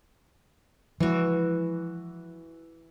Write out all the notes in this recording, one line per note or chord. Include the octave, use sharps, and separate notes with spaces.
E3 F3 G#3 F#4